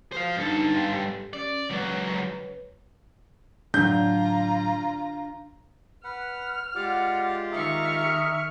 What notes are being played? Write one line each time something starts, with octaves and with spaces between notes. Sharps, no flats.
F#4 C5 F5 D#6
G2 D4 D#4 A4
F5 G5 C6
G4
C#4 D5
C#2 F#3 B4 C#5
A2 F#3 D4 F4 A#5 G6
B4 F#5 F6
G#3 F4 G4 D5 F#5 D6
D#3 G#4 E5 A#5 C#6 F6